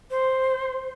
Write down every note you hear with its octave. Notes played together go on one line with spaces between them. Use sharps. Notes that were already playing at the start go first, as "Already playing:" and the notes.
C5